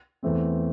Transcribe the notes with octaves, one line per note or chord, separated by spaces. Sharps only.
E2 E3 A3 C4